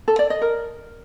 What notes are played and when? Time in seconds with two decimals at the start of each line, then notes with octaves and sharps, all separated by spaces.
0.08 A4
0.19 D5
0.30 D#5
0.42 A#4